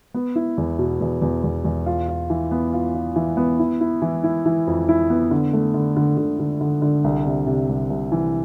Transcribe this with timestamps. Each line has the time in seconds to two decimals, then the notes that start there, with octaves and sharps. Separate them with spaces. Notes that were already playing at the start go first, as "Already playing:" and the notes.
0.14 B3
0.36 E4
0.58 E2
0.79 B2
1.01 E2
1.22 E2
1.44 E2
1.65 E2
1.86 F4
2.08 F4
2.30 E3
2.51 B3
2.73 F4
2.95 F4
3.16 E3
3.37 B3
3.59 E4
3.81 E4
4.02 E3
4.24 E4
4.46 E3
4.67 F2
4.89 E4
5.10 B3
5.31 D3
5.53 A3
5.74 D3
5.97 D3
6.17 D3
6.40 D3
6.61 D3
6.82 D3
7.04 C2
7.26 C3
7.47 C3
7.69 C2
7.90 C2
8.12 E3